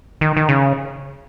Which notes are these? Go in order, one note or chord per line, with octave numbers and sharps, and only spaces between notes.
D#3
D#3
C#3